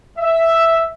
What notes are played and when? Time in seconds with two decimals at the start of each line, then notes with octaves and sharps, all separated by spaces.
0.19 E5